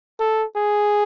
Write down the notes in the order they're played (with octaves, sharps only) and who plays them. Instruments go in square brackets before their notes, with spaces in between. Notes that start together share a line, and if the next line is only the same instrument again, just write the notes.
[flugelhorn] A4
G#4